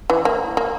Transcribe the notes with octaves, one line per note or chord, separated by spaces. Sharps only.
E3
A#3
A#3